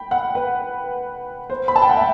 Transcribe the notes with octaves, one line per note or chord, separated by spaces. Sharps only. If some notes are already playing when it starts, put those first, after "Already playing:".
Already playing: G5 B5
F#5
B4
C5
B5
A5
G5
F#5
E5